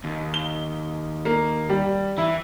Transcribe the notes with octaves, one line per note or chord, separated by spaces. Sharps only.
D#2
G7
A#3
G3 G4
E3 E4